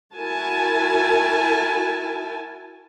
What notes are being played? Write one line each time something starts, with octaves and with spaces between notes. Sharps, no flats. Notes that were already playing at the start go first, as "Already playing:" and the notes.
E4 F#4 A#4 G#5 A5